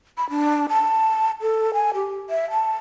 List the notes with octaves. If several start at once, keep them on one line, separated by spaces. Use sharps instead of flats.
B5
D4
A5
A4
G#5
G4
E5
A5